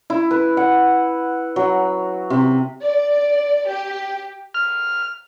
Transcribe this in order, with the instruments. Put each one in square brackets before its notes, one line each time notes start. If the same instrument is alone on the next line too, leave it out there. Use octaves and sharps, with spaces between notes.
[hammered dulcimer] E4
B4
F#5
F#3
C3
[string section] D5
G4
[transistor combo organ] F6